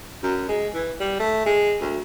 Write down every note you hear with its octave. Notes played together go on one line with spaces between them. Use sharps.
F#2
G#3
E3
G3
A3
G#3
D2